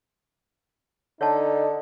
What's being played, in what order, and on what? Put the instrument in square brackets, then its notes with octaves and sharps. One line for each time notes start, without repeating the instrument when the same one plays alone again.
[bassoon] D3 [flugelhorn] D#4 [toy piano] C#5 A5